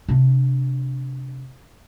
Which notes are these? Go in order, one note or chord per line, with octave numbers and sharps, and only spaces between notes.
C3 D4